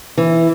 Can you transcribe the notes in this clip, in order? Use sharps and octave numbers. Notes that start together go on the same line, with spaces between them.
E3